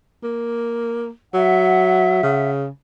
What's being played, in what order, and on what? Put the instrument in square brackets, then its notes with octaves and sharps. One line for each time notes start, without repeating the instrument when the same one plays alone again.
[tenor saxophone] A#3
[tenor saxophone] F#3 [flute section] E5 F#5
[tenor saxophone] C#3